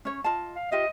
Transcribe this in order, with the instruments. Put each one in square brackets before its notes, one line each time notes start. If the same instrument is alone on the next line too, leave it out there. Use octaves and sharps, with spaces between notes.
[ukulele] C#4 C#5
F4 D#5 A5
[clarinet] F5
[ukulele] F4 G4 E5 [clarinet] D#5